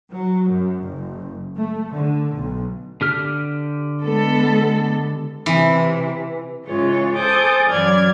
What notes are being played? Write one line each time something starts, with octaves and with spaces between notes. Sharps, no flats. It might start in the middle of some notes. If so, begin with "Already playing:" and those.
F#3
F#2
F#1
A3
D3
B1
D3 G4 F6
G#3 B3 A4
C3 E3
G#2 C#3 E3 G#3 F4 C#5
A4 C5 G#5 D6 D#6 G6
F#2 E3 F#3 D5 F6 G#6